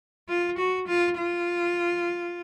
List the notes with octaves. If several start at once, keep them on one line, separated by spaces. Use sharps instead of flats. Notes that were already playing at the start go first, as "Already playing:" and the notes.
F4
F#4
F4
F4